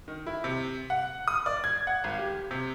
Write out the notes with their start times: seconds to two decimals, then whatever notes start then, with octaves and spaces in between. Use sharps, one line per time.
0.08 D#3
0.27 E4
0.44 C3
0.90 F#5
1.28 D#6
1.46 D5
1.64 G#6
1.87 F#5
2.04 G#1
2.19 G4
2.51 C3